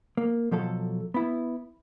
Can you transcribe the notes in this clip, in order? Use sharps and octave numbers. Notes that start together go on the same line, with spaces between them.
A#3
B2 F3 F#3 A4
B3 E4